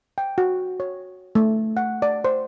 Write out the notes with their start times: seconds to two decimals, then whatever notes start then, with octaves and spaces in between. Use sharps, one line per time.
0.18 G5
0.38 F#4
0.80 C#5
1.35 A3
1.77 F#5
2.02 D5
2.24 C5